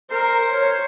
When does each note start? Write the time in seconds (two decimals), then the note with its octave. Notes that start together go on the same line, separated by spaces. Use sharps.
0.11 A#4 C5
0.52 C#5